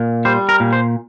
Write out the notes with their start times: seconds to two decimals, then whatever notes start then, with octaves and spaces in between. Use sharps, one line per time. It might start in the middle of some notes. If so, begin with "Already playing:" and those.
Already playing: A#2
0.25 G3 C5
0.49 A#4
0.60 A#2
0.73 C5